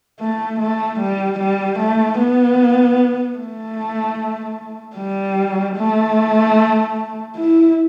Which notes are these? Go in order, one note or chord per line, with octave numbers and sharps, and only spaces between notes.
A3
A3
G3
G3
A3
B3
A3
G3
A3
E4